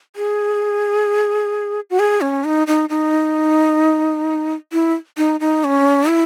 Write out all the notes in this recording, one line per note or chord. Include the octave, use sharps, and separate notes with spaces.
G#4
F#4
G#4
C#4
D#4
D#4
D#4
E4
D#4
D#4
C#4
E4